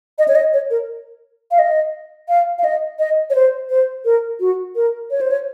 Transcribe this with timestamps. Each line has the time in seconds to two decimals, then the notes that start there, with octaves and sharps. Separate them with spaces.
0.19 D#5
0.28 C#5
0.35 D#5
0.53 C#5
0.70 A#4
1.51 F5
1.59 D#5
2.29 F5
2.58 F5
2.64 D#5
2.99 D#5
3.30 C#5
3.35 C5
3.70 C5
4.05 A#4
4.40 F#4
4.76 A#4
5.11 C#5
5.21 C5
5.31 C#5